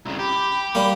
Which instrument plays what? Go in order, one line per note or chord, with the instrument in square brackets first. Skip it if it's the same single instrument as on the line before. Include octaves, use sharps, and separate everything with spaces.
[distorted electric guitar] C2 C#3 [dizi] A#5
[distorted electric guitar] G4 [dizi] B5
[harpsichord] G3 A#3 [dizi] B5